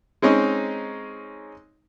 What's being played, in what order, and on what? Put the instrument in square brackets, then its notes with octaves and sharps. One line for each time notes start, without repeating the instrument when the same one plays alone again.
[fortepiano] G#3 C4 C#4 D#4